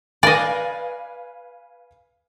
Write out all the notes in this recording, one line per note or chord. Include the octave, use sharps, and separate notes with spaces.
B4 D5 D#5 F5 G#5